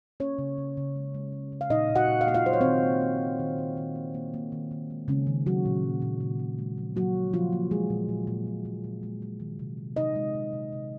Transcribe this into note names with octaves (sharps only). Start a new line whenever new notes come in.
A#3 C#4 C#5
C#3
C#3
C#3
G#3
G#3
G#3
C#3
F5
A#2 D#4 D#5
A#2
F#4 F#5
A#2
F5
A#3 F#5
F4 F5
F#3 C5
C#5
D#3 C4 C5
A#3
A#3
A#3
D#3
D#3
D#3
A#3
A#3
A#3
D#3
D#3
G#3
C#3 G#3 C#4
D#3
F#3 F#4
A#2
F#3
A#2
C#3
C#3
G#3
F3
F#3 A#3 F#4
C#3
C#3 F3 F4
A#3
G#3 A#3 G#4
A#2
A#2
A#2
A#2
A#2
A#2
G#3
G#3
D#3
C3
D#3
C3 D#4 D#5
G#3
C3
C3
C3